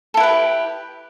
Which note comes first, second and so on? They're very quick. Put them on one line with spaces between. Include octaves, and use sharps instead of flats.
A4 E4 B4 G4